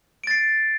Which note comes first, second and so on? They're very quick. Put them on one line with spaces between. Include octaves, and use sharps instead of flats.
D7 A6 C7